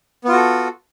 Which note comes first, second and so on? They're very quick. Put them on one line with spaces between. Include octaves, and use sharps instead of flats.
B3 F4 F#4 A4